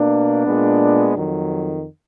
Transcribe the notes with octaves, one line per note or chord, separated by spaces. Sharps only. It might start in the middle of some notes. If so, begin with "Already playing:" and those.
Already playing: B2 A#3 D4
A#2 G#3 B3
F2 D#3 F#3